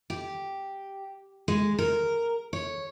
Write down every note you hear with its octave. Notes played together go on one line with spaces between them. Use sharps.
G4
G#3
A#4
C#5